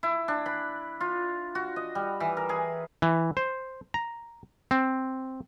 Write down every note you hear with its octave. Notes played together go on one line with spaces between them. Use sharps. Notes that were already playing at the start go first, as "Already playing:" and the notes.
E4
D4
B5
F4
F#4
D#5
G3
E3
A#4
G#4
E3
C5
A#5
C4